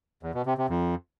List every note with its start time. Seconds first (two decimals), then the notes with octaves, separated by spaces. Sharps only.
0.23 E2
0.35 B2
0.46 C3
0.58 C3
0.69 F2